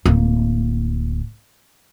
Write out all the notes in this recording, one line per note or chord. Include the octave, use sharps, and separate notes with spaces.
D1 A#3